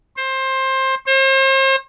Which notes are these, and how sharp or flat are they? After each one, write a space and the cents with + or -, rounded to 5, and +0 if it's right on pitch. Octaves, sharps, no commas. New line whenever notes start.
C5 +20
C5 +40